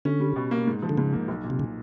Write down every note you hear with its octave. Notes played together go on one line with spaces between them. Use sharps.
D3 C#4
G3
B2
A#3
G#2
F3
D3
G#2 C#3
A#3
B1
A#2
C3
C#3